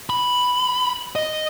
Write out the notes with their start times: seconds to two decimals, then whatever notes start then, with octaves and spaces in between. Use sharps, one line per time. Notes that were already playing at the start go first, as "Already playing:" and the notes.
0.10 B5
1.16 D#5